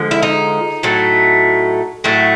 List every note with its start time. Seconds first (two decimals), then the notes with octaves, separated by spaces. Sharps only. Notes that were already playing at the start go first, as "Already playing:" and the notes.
Already playing: D3 F3 G#3
0.11 E4
0.23 D#4
0.83 A2 F#3 A3
2.04 A2 F#3 A3